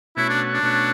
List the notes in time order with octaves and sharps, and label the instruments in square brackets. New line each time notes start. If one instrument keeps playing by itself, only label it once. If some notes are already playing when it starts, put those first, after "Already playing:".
[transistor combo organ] B2 A3 C#4 F#4 C#5 [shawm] E4
[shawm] D4
D4
[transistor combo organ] B2 A3 C#4 F#4 C#5